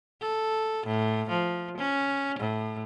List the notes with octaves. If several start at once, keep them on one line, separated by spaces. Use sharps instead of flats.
A4
A2
F3
C#4
A2